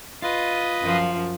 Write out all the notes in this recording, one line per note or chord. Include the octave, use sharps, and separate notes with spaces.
F4 B4 D#5
F#2 F3